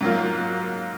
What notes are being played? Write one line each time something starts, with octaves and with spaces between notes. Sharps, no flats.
G#2 F#3 A#3 F4